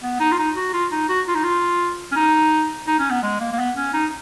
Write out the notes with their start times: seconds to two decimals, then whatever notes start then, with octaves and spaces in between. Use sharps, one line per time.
0.02 B3
0.20 D#4
0.32 F4
0.38 D#4
0.56 F#4
0.73 F4
0.91 D#4
1.09 F#4
1.27 F4
1.35 D#4
1.44 F4
2.12 C#4
2.16 D#4
2.87 D#4
2.99 C#4
3.10 B3
3.23 G#3
3.40 A#3
3.52 A#3
3.59 B3
3.77 C#4
3.93 D#4